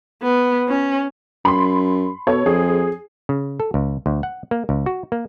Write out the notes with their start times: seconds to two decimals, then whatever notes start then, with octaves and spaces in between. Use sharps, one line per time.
0.23 B3
0.68 C#4
1.45 F#2 B5 C6
2.27 B2 A4 C#5
2.46 F2 G#4
3.29 C#3
3.60 A4
3.74 C#2
4.06 D2
4.23 F#5
4.51 A#3
4.69 C#2
4.86 F#4
5.12 A#3